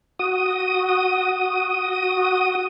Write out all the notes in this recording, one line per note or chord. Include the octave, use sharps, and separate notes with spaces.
F#4 D#6